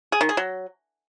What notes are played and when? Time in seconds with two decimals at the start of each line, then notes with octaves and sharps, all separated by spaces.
0.12 G#4
0.21 D#3
0.29 G#4
0.37 F#3